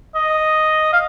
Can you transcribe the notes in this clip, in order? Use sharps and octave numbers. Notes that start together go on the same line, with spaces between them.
D#5
F5